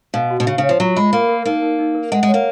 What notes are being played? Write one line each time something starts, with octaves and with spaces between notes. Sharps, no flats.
B2 F5
F#4
B2
C#3 F5
C#3
C#5
F3
F#3 F4
G#3 B5
A#3 A#4
A#4
A#3 D#4
D#4
D#4
A#4
G#3 F#5
G#3
C#5
A#3